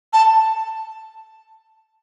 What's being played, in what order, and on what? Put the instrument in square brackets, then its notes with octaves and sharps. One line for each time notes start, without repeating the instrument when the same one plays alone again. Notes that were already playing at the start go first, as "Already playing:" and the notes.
[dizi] A5